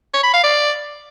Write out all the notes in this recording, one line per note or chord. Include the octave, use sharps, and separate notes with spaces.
C#5
B5
F5
D5